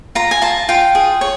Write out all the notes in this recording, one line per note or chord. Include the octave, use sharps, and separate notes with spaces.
F4 A#5
G#5
F4 A5
F4 G5
G#4
C#5